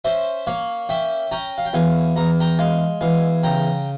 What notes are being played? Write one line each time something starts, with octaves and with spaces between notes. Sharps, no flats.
C#4 C5 E5
A#3 C#5 F5
C#4 E5 G5
C#4 G5 A#5
F5
G5
E2 F5 G#5
E2 A#5
G5 A#5
G#3 F5 G#5
E2 F5 G#5
C#3 G5 A#5